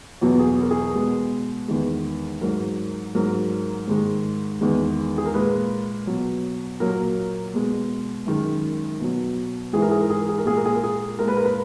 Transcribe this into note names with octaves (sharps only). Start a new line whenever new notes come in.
E2 B2 F#3 F#4
G#4
F#4
A#4
G#4
B2 G#3
E2 D#3 G#3
G#2 F#3 A#4
G#2 F#3 A#4
G#2 D#3 G#3
E2 D#3 G#3
G#4
A#4
A#2 G#3 B4
B2 F#3
A#2 F#3 A#4
B2 G#3
F#2 D#3 G#3
B2 F#3
G#2 E3 G#3 G#4
A#4
G#4
A#4
G#4
A#4
G#4
A#4
A#2 G#3 G#4
A#4
G#4
A#4
G#4
A#2 G#3 A#4
B4
A#4
B4